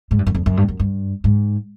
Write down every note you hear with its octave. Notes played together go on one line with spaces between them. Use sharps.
G#2
G2
F#2
F2
F#2
G2
F#2
G2
G#2